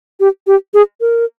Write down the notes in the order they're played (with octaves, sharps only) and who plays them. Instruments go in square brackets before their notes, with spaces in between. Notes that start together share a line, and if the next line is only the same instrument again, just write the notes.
[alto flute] G4
G4
G#4
A#4